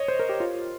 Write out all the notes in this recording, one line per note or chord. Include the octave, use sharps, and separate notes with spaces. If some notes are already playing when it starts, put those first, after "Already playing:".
Already playing: C#5 D#5
C5
A#4
G4
F4